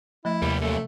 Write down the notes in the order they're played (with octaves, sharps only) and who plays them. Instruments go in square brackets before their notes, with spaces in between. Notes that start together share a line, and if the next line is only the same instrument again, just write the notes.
[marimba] F3 A3 [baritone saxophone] E4
[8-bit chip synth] D#2 [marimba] C3 [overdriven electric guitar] G3 B3
[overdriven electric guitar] F#2 A#2 [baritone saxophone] A3